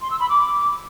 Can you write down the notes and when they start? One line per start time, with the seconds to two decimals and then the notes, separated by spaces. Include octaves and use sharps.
0.01 C6
0.11 E6
0.20 B5
0.29 D6